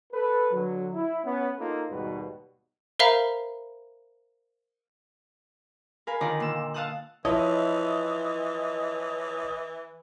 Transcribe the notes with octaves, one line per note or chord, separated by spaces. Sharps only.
A4 B4
D3 F#3
E4
B3 C#4
A#3 D#4 F4 A4
D#2 G#2 B2 G3 F#4 B4
A#4 C5 E5 F5 A#5 B5
A#4 F5 G#5 B5
D3 D#3 F4 D5 A#5
A#2 E6
F5 F#5 A5 D#6 E6 F#6
E3 F3 E4 C#5 D#5